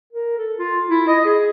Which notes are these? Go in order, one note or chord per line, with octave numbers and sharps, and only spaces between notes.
A#4
A4
F4
E4
D#5
G#4